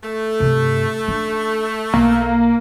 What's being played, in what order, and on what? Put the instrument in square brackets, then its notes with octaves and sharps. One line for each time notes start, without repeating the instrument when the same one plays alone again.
[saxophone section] A3
[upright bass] G2 C3
C#4 D4
[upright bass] B1 [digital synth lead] A#3